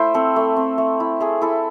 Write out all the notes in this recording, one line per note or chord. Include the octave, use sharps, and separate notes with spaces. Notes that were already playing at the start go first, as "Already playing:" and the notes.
Already playing: A3 E4 C5
C4 A4
A3
C4
A3
E4
A3 G#4
E4 A4